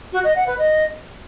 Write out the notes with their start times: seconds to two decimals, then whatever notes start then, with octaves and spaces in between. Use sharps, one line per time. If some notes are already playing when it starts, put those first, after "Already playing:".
0.13 F#4
0.24 D#5
0.36 F#5
0.47 B4
0.58 D#5